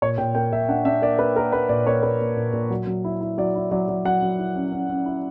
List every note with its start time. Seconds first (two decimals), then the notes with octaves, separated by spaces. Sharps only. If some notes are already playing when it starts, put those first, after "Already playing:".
0.02 A#2 C#5
0.18 A#2 G5
0.35 A#3 G5
0.52 A#2 E5
0.68 D4 F#5
0.85 D4 E5
1.02 A#3 D5
1.19 A#3 B4
1.36 A#3 A#4
1.52 A#3 B4
1.69 A#2 D5
1.87 A#3 C#5
2.03 A#3 B4
2.21 A#3
2.37 A#2
2.53 A#2
2.70 F#3
2.87 F#3
3.04 E4
3.21 E4
3.38 F#3 D5
3.55 E4
3.71 F#3 D5
3.89 F#3
4.05 F#3 F#5
4.22 F#3
4.38 E4
4.56 C#4
4.72 C#4
4.89 C#4
5.05 E4